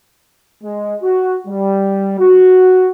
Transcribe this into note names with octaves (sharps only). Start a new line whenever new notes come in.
G#3
F#4
G3
F#4